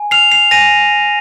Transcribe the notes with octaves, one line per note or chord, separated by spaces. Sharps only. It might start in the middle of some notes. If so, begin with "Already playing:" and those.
Already playing: G#5
F6 C7 F7
C7 F7
G#5 A#6 D#7